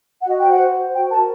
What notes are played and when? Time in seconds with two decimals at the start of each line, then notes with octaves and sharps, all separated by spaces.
0.21 F#5
0.28 F#4 D#5
0.39 G5
0.44 C5
0.50 F#5
0.62 C5
0.78 C5
0.94 F#4 G5
1.10 A#4 A5